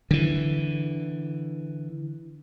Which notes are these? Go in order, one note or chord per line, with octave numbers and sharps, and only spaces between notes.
D3 E3